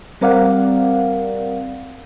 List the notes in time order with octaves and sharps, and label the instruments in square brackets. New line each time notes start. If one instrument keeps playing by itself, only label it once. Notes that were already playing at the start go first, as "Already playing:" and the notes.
[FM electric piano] G3 C4 A#4 D5 F5 F#5